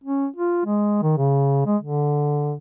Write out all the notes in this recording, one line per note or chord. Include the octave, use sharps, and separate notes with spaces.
C#4
F4
G#3
D#3
C#3
G#3
D3